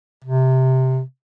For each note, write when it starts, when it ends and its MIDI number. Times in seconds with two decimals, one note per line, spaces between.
0.25 1.01 48